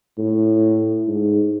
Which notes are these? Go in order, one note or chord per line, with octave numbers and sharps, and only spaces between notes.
A2
G#2